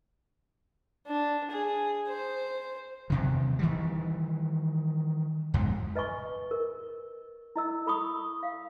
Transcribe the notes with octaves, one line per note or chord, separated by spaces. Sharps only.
D4
G#4
C5
E2 C3 D#3
D#3 E3 G3
F2 G#2 B2
B4 D#5 G#5 C#6
A#4
E4 D#5 E6
A4 B5 C#6 D#6
F5